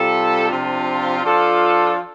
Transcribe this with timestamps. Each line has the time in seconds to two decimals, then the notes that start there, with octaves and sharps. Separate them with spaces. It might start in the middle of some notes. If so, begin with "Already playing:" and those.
Already playing: C3 G3 F4 A4
0.49 C3 F3 D4 F4
1.24 F3 D4 F4 A4